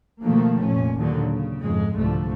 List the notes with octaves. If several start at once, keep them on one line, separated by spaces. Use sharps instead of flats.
B2 D#3 F3 A3 A#3
F1 A#2 C#4
D#2 A#2 D3 D#3 F#3
C#3
F2 G#2 G#3
C2 G#2 D3 F3 A3